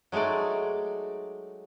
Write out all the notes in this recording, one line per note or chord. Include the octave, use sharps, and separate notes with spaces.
F#3 G#3 A3 D#4 D5